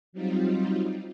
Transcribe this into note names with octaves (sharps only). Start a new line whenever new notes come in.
F#3 G3 C4 D#4 F4